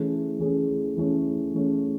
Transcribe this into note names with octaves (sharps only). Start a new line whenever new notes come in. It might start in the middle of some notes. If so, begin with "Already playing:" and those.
Already playing: E3 A3 C#4 G#4
E3 A3 C#4 G#4
E3 A3 C#4 G#4
E3 A3 C#4 G#4